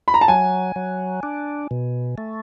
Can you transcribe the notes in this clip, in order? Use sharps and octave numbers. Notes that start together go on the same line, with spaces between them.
B5
A#5
A5
F#3 G#5
F#3
D4
B2
A3